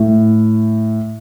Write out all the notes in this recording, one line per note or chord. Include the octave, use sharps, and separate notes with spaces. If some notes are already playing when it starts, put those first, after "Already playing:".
Already playing: A2